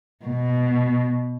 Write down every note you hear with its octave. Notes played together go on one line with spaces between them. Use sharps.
B2